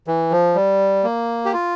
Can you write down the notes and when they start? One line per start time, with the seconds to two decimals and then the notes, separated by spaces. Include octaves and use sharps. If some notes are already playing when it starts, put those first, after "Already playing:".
0.07 E3
0.32 F3
0.55 G3
1.04 A#3
1.45 G4
1.53 F4